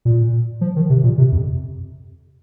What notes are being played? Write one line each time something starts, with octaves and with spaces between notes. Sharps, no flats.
A#2
F3
D#3
C3
A#2
C3
F2